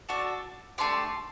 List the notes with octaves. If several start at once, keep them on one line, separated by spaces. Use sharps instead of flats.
D4 F#4 A4
A3 D4 G4 C6